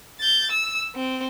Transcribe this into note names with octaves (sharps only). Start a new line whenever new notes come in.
G6 A6
E6
C4